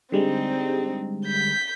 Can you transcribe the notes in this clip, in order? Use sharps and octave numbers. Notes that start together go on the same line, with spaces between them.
D3 G3 G#3 C4 D#4
G6 B6